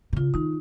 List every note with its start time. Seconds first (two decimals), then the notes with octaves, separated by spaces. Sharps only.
0.13 C3
0.16 C#3 F4
0.34 D#3 D#4